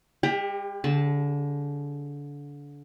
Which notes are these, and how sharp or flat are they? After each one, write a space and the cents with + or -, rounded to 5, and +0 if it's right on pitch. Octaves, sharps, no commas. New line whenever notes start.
G#3 -40 G4 +20 A#5 +0
D3 -30 A5 -10